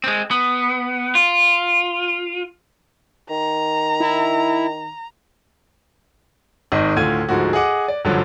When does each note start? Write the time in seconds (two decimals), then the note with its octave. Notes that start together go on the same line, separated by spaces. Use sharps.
0.04 G#3 C4
0.31 B3
1.15 F4
3.30 D#3 A#5
4.00 E4
6.72 G#1 D#3 G#3 D#5
6.96 D2 A2 F4 G#6 D#7
7.29 D2 G#2 F3 F#4
7.53 G#4 D#5 F#5 D6
7.88 D5
8.05 A1 G2 D3 F3 F#3